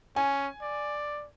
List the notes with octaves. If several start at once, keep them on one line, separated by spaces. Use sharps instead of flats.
C#4 G#5
D5